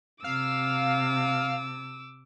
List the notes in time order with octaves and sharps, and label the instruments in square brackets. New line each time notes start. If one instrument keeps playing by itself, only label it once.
[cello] C3 [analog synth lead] F5 [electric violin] D6 E6